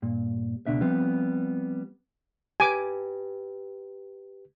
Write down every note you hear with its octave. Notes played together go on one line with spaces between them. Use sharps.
G2 A#2
C#2 B2 D4 E5
F3 G3 B3 C4
G4 B4 G#5 D6